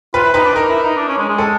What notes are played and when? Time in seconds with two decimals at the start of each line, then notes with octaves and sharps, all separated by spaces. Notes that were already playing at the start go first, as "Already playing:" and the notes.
0.14 F4 B4
0.24 E4
0.34 D#4 B4
0.45 D4
0.55 D#4 A#4
0.69 E4
0.83 D#4
0.97 D4
1.08 C#4
1.18 G#3
1.29 G#3
1.38 A4